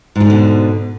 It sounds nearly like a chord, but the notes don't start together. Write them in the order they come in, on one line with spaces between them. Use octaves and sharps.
G#2 F3 D3 B2